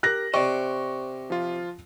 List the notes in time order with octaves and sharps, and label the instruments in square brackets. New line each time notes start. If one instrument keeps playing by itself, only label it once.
[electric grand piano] G4 A#4 [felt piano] F#6 A#6
[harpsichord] C3 [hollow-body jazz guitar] C5 D5 D#5 [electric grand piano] C#6
[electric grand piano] F3 F4